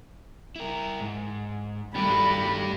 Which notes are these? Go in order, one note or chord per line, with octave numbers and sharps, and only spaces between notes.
E4 A#4
G#2
G2 D#3 A3 G4 B5